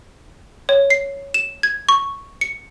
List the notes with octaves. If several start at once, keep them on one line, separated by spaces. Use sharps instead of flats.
C#5
C7
E7
G#6
C#6
C#7